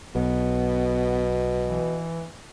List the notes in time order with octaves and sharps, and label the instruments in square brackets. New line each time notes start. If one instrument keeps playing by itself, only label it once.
[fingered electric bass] B1 [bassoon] B2 [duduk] B3
[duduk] E3